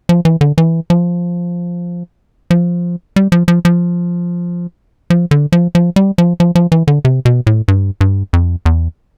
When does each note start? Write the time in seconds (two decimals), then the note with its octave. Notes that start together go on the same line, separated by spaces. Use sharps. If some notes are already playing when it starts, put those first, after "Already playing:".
0.09 F3
0.25 E3
0.41 D3
0.58 E3
0.90 F3
2.51 F3
3.16 G3
3.32 F3
3.48 F3
3.65 F3
5.10 F3
5.31 D3
5.52 F3
5.75 F3
5.96 G3
6.18 F3
6.40 F3
6.55 F3
6.72 E3
6.88 D3
7.05 C3
7.25 B2
7.47 A2
7.68 G2
8.01 G2
8.33 F2
8.66 E2